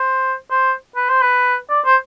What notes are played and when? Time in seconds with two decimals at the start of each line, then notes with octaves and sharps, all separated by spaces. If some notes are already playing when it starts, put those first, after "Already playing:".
Already playing: C5
0.50 C5
0.96 B4
1.09 C5
1.22 B4
1.70 D5
1.85 C5